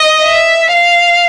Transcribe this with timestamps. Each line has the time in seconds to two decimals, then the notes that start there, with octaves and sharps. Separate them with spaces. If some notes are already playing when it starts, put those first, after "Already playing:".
Already playing: D#5
0.23 E5
0.73 F5